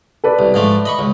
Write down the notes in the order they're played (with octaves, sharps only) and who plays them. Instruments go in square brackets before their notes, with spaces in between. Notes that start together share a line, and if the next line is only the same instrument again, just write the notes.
[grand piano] A4 B4 D5
[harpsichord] C2
G#2 F3 A3
D#5 B5 C#6
C#2